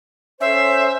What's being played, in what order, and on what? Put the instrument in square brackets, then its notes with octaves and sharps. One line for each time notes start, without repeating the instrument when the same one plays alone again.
[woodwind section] C#4 A4 C5 [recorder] E5